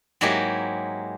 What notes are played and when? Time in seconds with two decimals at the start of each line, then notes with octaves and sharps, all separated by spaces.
0.21 G#2 F#3 G#3 A#3 E4 G4